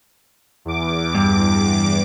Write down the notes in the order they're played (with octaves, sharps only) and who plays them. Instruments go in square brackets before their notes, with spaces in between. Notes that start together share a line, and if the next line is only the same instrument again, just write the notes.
[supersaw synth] E2 D6
[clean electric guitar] G2